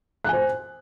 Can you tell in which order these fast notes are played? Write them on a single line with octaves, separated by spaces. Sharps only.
F#6 G#5 C5